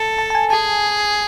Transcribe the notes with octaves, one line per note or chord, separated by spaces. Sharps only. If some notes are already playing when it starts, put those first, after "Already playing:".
Already playing: A4
A5
A5
G#5
G#4 A5